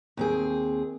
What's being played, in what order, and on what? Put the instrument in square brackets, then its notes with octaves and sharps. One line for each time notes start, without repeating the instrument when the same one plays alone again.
[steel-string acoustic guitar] D#2 C4 G#4